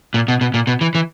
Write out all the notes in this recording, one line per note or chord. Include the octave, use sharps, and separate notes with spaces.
A#2
B2
B2
A#2
B2
E3
E3